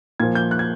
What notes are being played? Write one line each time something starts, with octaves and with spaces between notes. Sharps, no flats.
A#2 F3 G#6
G6
F#6
G#6